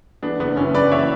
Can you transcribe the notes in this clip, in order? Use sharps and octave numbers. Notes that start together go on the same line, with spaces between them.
E3 B3 D4
F#1 B3 D4
F#2 C#4 E4
F#2 B4 D5
E3 C#5 E5